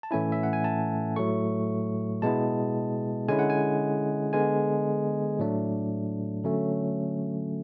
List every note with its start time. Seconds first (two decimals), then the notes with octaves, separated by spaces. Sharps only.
0.03 A5
0.11 A2 E3 A3 C#4 E4 G#5
0.32 E5
0.43 F#5
0.53 G#5
0.64 A5
1.16 A2 F#3 A3 C#6
2.22 B2 G#3 B3 E4 A5
3.29 D3 G#3 C#4 E4 G#5
3.39 F#5
3.50 G#5
4.33 D3 G#3 B3 G#5
5.39 A2 F#3 A3 D4
6.44 D3 F#3 A3 C#4